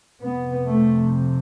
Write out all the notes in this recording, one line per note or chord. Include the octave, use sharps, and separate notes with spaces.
F2 C3 B3
A3